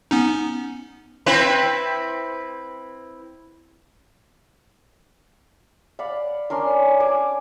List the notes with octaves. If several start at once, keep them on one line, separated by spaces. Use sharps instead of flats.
B3 C#4 D#4
C4 E4 B4
D5 F5 F#5 B5
C#4 D4 A#4 C6
G#5 D6